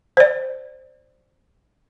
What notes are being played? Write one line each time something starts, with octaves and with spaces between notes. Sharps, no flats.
C5 D5